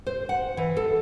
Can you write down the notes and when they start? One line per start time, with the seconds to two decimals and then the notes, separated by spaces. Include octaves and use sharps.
0.07 C5
0.29 F#5
0.57 E3
0.77 A4